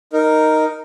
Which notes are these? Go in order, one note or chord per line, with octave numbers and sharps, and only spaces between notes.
D#4 A#4